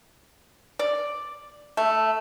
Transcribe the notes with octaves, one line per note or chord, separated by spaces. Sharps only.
D5
A3